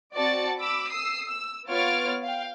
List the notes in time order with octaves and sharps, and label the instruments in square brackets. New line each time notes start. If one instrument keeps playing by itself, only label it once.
[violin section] C4 F#4 D5 A5 A6 C#7
B5 D6 E6
D#6 E6 C7
E6
B3 F4 C#5 F6 A6 D7
F5 G5